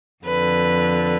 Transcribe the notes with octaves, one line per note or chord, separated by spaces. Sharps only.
F2 D3 B4